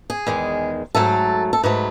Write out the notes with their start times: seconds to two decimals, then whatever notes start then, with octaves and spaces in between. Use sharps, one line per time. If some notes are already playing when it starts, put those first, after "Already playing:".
0.10 G#4
0.27 E2 D#3 G#3
0.95 G#2 F#3 A3 A4
1.53 A4
1.63 G#2 F#3 A3 B4